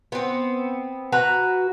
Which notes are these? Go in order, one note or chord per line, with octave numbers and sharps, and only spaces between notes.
B3 C4
F#4 B4 A#5